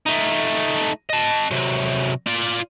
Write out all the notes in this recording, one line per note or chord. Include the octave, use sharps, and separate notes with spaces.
A3 D#4
D#5 A5
C3 F#3
F4 D5